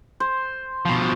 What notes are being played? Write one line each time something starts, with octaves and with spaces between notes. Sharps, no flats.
C5
B2 F3